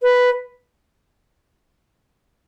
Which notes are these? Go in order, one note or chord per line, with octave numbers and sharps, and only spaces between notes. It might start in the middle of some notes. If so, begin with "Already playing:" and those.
B4